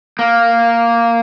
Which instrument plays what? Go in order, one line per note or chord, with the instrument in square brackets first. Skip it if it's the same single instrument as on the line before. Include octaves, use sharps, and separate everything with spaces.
[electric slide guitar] A#3